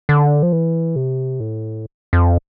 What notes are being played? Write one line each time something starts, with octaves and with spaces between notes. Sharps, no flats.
D3
F3
E3
C3
A2
F2